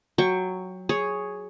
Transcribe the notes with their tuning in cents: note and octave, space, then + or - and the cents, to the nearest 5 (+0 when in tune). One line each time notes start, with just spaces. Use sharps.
F#3 +0 G5 +15 C#6 +0
G#4 +0 C#5 +0